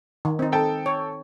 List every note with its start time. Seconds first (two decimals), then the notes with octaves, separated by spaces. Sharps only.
0.25 D#3
0.39 C4 D#4
0.52 A4 G5 A5
0.86 C#5